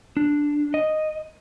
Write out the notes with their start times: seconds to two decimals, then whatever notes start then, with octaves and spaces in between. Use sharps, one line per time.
0.17 D4
0.74 D#5